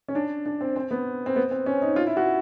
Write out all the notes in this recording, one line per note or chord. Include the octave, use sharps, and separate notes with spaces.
C#4
D4
D4
C4
C4
B3
C4
B3
C4
C#4
D#4
F4
E4
F#4